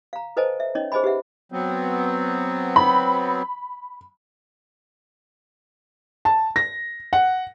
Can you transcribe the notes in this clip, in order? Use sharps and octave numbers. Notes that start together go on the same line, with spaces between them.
F5 A#5
A4 B4 C5 D#5 G#5 A5
E5
C#4 D#4 C#5 D#5
G#4 C5 D#5 G#5 B5
G4 B4 E5 F#5
F#3 B3 C4
B5
A5
A#6
F#5